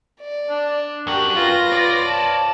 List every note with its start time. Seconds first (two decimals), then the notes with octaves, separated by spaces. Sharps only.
0.21 D5
0.50 D4
1.07 F#2 F#4 G4 A#4
1.36 F4 B4 A#6
1.72 C#5 D5
2.06 A5